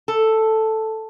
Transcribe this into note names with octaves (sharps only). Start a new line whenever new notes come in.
A4